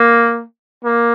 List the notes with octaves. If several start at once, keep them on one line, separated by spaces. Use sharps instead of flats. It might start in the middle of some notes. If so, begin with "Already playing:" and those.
Already playing: A#3
A#3